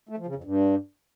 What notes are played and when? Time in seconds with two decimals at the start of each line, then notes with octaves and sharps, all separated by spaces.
0.09 A3
0.18 F3
0.26 C#3
0.35 F2
0.44 G2